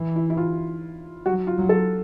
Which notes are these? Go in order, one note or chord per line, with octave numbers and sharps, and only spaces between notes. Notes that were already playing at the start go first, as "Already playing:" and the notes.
Already playing: E3
E4
E4
F4
F#3 F#4
F4
F#3
A4